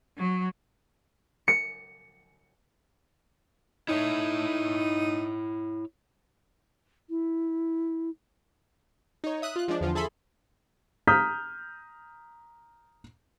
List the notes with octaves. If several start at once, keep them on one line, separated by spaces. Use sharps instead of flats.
F#3
C#7
D#4 E4 C#5 E5
E4
D#4 C#5
E5 D#6 F#6
F4 F#6
F3 G#3 D4 D5
E2 D3 F3 F4
G#4 A4 E5 B5 C6
A#5 D#6 F6 G6 B6